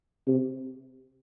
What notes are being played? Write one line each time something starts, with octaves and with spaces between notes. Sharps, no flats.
C3